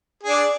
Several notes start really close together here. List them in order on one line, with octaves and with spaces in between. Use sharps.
G#4 D4 D5